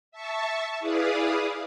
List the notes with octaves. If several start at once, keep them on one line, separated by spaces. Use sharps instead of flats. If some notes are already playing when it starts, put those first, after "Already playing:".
E5 A5 C#6
E4 G#4 B4 D5 F5 D#6